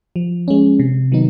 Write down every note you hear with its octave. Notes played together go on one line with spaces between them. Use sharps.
F3
G#3 C#4
C3
D#3 F#3 B3 D#4